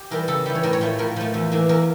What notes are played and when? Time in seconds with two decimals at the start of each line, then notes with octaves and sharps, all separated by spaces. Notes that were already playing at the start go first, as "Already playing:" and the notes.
Already playing: G4
0.11 E3 G3 A#4
0.28 C#3 A4
0.46 E3 G3
0.55 C#5
0.63 A2 A#4
0.73 C#5
0.81 F3 A3
0.99 A2 A#4
1.16 F3 A3
1.34 E2
1.52 E3 A#3
1.69 E2 A#4